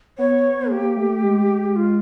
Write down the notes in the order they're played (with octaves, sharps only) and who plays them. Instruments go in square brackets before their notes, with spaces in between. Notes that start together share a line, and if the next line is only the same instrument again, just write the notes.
[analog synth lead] B3 [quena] C#5
[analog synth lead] A#3 [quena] G4
[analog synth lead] A3
G#3
[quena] F4